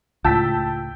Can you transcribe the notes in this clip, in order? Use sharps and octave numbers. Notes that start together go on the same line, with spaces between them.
C#2 A2 F4 G5 A5 E6 B6